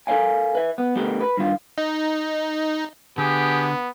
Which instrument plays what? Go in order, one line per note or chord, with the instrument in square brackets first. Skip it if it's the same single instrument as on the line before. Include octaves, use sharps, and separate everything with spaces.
[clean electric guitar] A4 A#4 C5 C#5 F5 G#5
B4 E5
B3
A3 B3 G4 A#4
B4
G2 D#3 F4
[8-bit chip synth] D#4
[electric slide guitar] D3 [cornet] B3 [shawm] G4 [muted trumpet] G#4